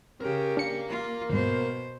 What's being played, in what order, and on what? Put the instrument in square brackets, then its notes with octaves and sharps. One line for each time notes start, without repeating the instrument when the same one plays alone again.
[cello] C#3 G4 [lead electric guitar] A#4
[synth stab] D4 C#7 [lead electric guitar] A#4 F5
[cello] F4
[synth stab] D#2 G#2 [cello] B2 C5